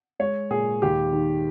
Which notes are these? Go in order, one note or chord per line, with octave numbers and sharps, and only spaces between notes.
G#3 C#5
A#2 G#4
D#2 G4
D#3